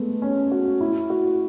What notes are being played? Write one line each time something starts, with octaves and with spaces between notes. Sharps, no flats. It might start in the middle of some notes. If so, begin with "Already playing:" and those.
Already playing: G#3 A3 B3
C#4
F#4
E4
F#4